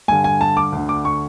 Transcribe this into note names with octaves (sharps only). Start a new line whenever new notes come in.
G2 D3 G#5
G#5
A5
D6
D2 D3
D6
C#6